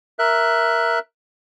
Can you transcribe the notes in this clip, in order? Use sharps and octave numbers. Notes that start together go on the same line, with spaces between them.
A#4 E5 F#6